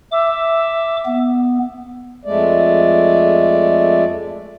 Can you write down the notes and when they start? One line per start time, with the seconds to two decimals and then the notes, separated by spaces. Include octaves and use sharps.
0.11 E5 D6
1.05 B3
2.25 F2 G#3 A3 D5